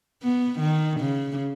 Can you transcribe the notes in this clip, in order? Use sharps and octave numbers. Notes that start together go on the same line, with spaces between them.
B3
D#3
C#3